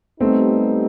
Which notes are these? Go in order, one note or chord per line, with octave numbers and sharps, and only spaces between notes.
G3 A3 B3 C4 D#4 G4